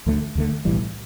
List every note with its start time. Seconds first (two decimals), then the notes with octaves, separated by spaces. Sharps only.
0.06 D2 D3 A3
0.35 D2 D3 A3
0.65 B1 A2 E3 G3